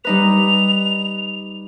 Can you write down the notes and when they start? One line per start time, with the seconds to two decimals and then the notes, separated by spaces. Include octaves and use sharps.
0.04 G3 D#4 B4 F7